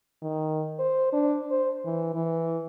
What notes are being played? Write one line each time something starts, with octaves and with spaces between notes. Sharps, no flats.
D#3
C5
D4
C5
E3
E3